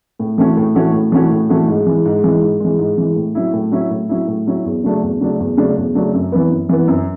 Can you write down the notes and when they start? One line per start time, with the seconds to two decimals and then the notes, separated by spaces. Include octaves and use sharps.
0.19 A2
0.38 E3 A3 C#4 F#4
0.57 A2
0.75 E3 A3 C#4 F#4
0.93 A2
1.12 E3 A3 C#4 F#4
1.30 A2
1.49 E3 A3 C#4 F#4
1.68 G#2
1.87 E3 G#3
2.05 G#2
2.24 E3 G#3
2.42 G#2
2.60 E3 G#3
2.79 G#2
2.98 E3 G#3
3.16 A2
3.35 F#3 C#4 E4
3.54 A2
3.71 F#3 C#4 E4
3.90 A2
4.09 F#3 C#4 E4
4.27 A2
4.47 F#3 C#4 E4
4.65 E2
4.84 C#3 F#3 A3 D4
5.02 E2
5.20 C#3 F#3 A3 D4
5.39 E2
5.57 C#3 F#3 A3 D4
5.76 E2
5.95 C#3 F#3 A3 D4
6.13 F#2
6.32 E3 B3
6.51 F#2
6.69 E3 B3
6.88 F#2